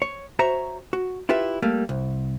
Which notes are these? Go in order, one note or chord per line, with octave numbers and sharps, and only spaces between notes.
C#5
F#4 C5 C#5 E5 A#5
F#4
E4 F4 G4 B4 E5
G3 A3 A#3
C2